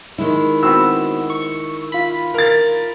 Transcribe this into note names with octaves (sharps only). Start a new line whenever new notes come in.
D#3 G#3 E4
B3 C4 F#4 E6
C#6
F4 B5
A#4 A6